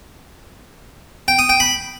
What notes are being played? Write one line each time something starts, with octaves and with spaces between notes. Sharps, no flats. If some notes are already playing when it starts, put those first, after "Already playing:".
G5
D#6
G5
B5